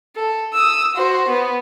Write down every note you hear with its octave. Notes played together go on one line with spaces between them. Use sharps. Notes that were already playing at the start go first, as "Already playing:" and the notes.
A4
D#6 E6
F#4 C5
B3